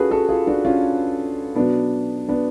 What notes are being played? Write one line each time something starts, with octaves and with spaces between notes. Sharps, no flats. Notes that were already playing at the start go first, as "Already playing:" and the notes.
Already playing: C#4 F4 F#4 G#4 A4 B4
F#4 A4
F4 G#4
D4 F#4
C#4 F4
B2 F#3 B3 D4
B3 D4